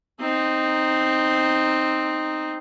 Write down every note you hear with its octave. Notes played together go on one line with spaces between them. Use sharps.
C4 D#4